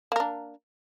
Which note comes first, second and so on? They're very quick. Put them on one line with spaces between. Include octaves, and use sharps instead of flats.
A#3 A#4 D4